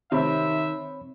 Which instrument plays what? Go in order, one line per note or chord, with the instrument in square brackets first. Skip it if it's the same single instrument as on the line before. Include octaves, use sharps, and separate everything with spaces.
[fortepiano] C3 [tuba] D#3 [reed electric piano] C4 C#5 B5 [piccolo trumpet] E5